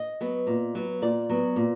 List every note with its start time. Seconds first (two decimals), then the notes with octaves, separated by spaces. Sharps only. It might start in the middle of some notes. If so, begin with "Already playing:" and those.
Already playing: D#5
0.21 F#3 B3
0.47 A#2
0.75 F#3 B3
1.02 A#2 D5
1.29 F#3 B3
1.56 A#2